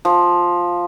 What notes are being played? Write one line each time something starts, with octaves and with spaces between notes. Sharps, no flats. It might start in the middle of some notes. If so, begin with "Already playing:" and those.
F3